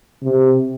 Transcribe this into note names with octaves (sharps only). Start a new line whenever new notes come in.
C3